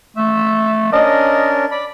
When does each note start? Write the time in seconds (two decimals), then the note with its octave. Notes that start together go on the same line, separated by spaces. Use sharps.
0.16 A3 E5
0.92 C#4 D4 A#4 D#5
1.71 D5 B5